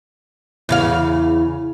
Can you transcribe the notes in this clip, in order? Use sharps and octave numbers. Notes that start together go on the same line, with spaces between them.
E2 C#3 F5